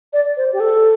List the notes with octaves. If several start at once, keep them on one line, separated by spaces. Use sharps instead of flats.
D5
C5
G4
A4